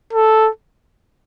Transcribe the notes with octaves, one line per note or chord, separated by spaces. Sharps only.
A4